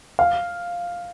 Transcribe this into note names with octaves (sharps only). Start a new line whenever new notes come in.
F5